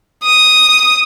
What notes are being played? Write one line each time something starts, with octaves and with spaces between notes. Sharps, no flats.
D#6